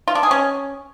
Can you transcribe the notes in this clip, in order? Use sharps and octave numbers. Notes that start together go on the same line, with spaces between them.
F4
D4
G#4
C#4